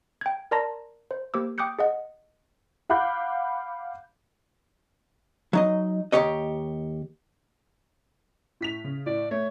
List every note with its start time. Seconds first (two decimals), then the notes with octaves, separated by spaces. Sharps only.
0.21 G5 G#6
0.51 A#4 D5 A5 A#5 C6 A#6
1.11 C5
1.34 A#3 G4 C5 D6 E6
1.58 G5 D6 D#6 F#6 G6 C#7
1.79 G#4 D#5 F#5
2.90 F5 F#5 B5 D6 F#6 G6
5.53 F#3 D#4 D#5
6.12 D#2 A#2 G4 C#5 D#5
8.61 A2 B6 F7
8.84 C#3
9.06 A2 D5
9.31 A3 C#5